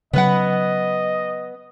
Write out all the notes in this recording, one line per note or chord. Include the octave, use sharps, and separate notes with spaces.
C#3 F#3 B3 B4 D#5 F#5